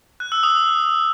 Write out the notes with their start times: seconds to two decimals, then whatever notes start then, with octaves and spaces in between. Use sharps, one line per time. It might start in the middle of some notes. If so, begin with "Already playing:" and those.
0.20 F#6
0.32 E6
0.43 D#6